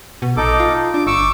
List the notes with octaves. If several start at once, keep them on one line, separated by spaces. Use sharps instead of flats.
B2
A#1 D#4 A4 D6
F4
D4 D6
G1 C#6 D6 E6